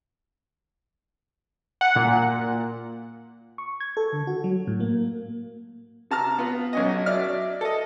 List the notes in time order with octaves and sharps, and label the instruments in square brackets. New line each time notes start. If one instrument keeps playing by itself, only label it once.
[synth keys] F#5
A#2
[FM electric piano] C#6
G#6
A4
D3
F#4
F#3
A2
A#3
[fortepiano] C3 A5 A#5 F6
B3 F4
B1 C#4 D#5
F#3 D5 E5 F6
A4 D#5